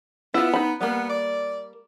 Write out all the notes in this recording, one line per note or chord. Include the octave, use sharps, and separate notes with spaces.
B3 E4 F4
D#4 B5
G3 A#3 B3
D5